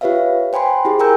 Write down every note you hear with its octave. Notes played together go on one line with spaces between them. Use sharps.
F4 G4 B4 C#5 E5 F5
C5 G5 G#5 B5 C6
E4 G4 G#4
A#4 G5 G#5 A#5 E6 G6